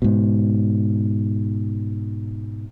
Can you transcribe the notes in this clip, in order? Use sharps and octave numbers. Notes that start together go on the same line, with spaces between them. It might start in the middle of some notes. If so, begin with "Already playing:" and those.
G#2 B2